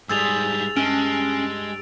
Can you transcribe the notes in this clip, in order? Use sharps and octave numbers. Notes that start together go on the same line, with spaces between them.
G#2 G3 G#4 C5 E6 A6 F7
G2 G#3 C#4 D7